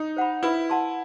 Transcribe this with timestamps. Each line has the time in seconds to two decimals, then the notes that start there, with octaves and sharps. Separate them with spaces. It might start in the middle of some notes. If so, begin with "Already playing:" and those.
Already playing: D#4
0.17 C5 F#5 B5
0.43 E4 B4
0.70 F#5 A5 C6